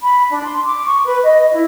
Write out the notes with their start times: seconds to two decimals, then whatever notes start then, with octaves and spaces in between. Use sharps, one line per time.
0.02 B5
0.30 D4
0.43 C6
0.65 D6
0.83 C#6
1.05 B4
1.24 D#5
1.52 E4